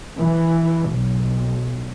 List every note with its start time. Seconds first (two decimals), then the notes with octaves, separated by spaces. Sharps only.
0.18 E3
0.90 B1